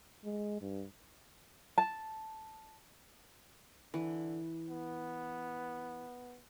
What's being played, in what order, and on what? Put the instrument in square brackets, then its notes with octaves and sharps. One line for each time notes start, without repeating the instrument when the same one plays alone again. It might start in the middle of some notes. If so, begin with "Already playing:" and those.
[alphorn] G#3
G2
[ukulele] A5
[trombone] D3 [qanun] E3
[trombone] B3